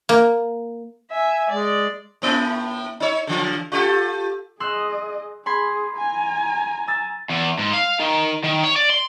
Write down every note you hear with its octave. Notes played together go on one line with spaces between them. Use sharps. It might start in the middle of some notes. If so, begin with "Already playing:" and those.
A#3
E5 G#5
G#3 D5
A2 A#3 E4
D#4 C#5
D3 E3
F4 G4 A4
G#4 D#5 C6 E6 F#6
G#4 B5 C6 G#6
G#5 A#5
E6 A6
E2
G#2
F5
D#3
D#3
C#5
D5
C6